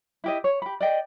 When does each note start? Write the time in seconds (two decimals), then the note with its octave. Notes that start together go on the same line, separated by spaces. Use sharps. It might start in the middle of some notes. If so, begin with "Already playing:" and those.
0.24 E4 G4 D#5
0.44 C#5
0.62 G4 B5
0.81 D5 D#5 G5